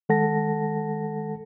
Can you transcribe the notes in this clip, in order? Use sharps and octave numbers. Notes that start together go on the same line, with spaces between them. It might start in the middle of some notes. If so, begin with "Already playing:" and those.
D#3 G#3 A4 F#5 A5 A#6